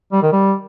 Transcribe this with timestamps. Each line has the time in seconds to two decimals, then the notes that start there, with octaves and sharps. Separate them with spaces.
0.12 G3
0.23 D#3
0.33 G3